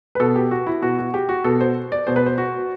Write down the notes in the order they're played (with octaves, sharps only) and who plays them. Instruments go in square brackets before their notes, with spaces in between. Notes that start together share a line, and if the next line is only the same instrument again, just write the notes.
[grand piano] B4
B2 A4
G4
F#4
E4
B2 F#4
F#4
G4
F#4
B2 A4
C5
D5
B2 C5
B4
C5
F#4